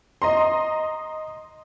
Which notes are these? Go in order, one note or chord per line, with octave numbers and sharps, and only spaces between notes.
D#5 A#5 C6